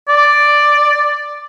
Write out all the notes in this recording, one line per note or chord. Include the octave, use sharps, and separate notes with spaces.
D5